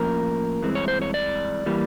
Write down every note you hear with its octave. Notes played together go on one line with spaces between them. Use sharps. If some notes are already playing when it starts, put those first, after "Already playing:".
Already playing: A2 F3 A#3 C#4 A#4
G2 E3 G#3 C4
C#5
C5
C#5
D5
E3 G3 A#3